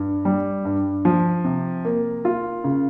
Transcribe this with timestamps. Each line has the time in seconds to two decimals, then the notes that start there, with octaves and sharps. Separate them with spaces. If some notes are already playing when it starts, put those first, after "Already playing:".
Already playing: G2
0.25 G3
0.65 G2
1.05 F3
1.44 C3
1.85 A#3
2.25 F4
2.64 C#3